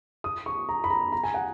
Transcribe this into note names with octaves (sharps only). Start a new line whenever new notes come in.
D#6
C#6
A#5
B5
A#5
A#5
G#5
F#5